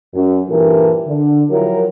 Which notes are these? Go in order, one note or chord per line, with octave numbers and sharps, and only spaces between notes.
F#2
G2 A#2 E3 G4 A4 A#4
D3
F3 F#3 E4 G4 A#4